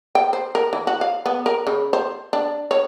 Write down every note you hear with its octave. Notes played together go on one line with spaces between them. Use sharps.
G5
C5
A#4
E3
F#4
F5
B3
A#4
C#3
C5
D4
C#5